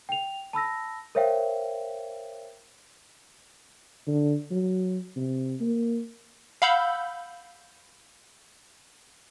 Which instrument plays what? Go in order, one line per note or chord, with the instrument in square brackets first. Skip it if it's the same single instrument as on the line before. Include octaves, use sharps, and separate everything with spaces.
[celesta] G5 F7
A5 B5 E6 A#6
A#4 C5 C#5 E5 F5 G5
[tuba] D3
F#3
C3
A#3
[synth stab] F5 F#5 B5 E6 G6